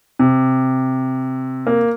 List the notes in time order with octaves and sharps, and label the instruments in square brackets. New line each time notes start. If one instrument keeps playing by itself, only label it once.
[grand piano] C3
A#3